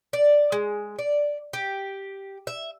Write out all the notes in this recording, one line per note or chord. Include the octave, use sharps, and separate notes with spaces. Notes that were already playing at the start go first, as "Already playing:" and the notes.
D5
G#3
D5
G4
E5